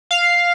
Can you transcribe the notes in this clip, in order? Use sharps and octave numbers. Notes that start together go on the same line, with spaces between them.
F5